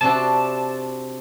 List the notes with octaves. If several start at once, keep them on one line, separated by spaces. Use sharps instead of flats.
C3 D4 F#4 A5